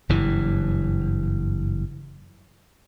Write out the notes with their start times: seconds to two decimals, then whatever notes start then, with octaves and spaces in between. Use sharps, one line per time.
0.09 F#1 G2 E3